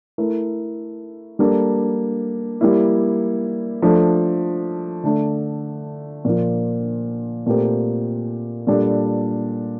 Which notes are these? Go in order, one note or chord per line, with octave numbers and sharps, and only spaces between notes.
A3 E4 A#4
G3 A#3 D4 A4
G3 A#3 E4
F3 A3 D4 A4
D3 A3 D4
A#2 F3 A#3 F4
A#2 A3 C4 G4 A#4
A#2 G3 D4 A4